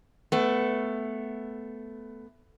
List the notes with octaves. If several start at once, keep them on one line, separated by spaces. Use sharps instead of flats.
A3 B3